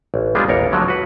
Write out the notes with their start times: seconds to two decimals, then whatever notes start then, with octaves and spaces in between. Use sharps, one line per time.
0.14 A1
0.35 G3 G#3 B3 D4 F4
0.48 A1 D#2 A#4 C#5
0.71 D3 F3 F#3 G#3 A#3 C#4
0.88 F#4 B4